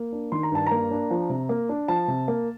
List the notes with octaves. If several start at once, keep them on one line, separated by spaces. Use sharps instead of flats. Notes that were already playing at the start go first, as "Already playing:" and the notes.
Already playing: A#3
D4
D#3 C6
A#5
G2 A5
A#3 A#5
D4
F3
C3
A#3
D4
F3 A5
C3
A#3